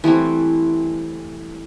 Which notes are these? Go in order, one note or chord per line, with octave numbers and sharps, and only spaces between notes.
E3 G3 A3 C4